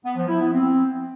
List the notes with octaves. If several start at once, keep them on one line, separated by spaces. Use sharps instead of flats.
B3
F3
E4
B3
C4